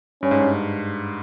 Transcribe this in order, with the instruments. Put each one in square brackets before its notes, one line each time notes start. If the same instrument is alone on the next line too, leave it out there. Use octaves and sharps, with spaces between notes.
[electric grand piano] G2 [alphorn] C#4
[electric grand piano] G#2
G2